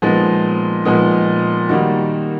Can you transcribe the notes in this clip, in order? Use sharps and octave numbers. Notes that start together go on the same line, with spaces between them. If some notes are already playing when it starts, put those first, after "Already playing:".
A#2 F3 G#3 B3 D#4
A#2 F3 G#3 B3 D#4
D#3 G3 A#3 D#4 F#4